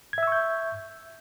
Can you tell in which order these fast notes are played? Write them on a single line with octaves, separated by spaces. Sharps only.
G#6 E5 E6 C#6 G6